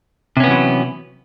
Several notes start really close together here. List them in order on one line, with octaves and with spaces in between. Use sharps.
C3 C#4 B3 E3 F#3